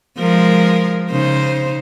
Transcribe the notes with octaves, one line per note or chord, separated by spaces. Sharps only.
F3 G#3 A#4
C#3 D#4 C5